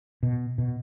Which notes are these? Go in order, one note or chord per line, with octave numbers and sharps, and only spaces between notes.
B2
B2